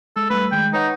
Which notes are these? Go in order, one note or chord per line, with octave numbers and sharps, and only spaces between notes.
G#3 A4
G3 A3 B4
D#3 G#3 G5
D#4 B4 C#5 F#5